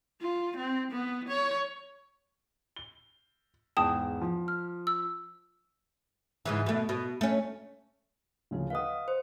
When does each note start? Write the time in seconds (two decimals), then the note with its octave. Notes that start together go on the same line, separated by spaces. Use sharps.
0.22 F4
0.57 C4
0.91 B3
1.28 C#5
2.76 G7
3.77 E2 G#2 G5 A5 D#6
4.22 F3
4.48 F6
4.87 E6
6.45 G#2 C#3 E3
6.66 B2 A3
6.89 B2
7.21 A3 C#4
8.51 D2 C#3 F3
8.70 B4 D#5 F5 F#5 D#6
9.08 C5